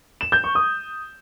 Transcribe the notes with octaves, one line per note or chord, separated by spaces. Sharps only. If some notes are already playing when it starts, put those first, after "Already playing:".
E7
G6
C#6
D#6